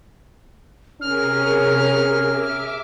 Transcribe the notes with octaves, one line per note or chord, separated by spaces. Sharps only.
C3 C#4 G#4 A#4 F6
E5 D6